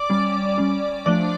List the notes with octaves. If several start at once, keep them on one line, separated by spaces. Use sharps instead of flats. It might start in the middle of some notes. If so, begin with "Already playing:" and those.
Already playing: D5 D6
G3 C#4
G3 C#4
F3 A3 D4 D5 D6